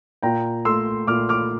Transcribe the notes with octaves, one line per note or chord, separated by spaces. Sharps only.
A#2 G5 A#5
A3 C6 E6
A#2 D6 F6
D6 F6